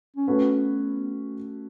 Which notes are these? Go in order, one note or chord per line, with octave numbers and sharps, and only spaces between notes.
C#4
A3 B3 C#4 F#4 B4